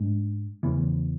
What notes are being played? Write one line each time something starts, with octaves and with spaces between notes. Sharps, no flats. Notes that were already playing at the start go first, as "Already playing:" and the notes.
Already playing: G#2 G#3 D4
E2 C#3 E3 B3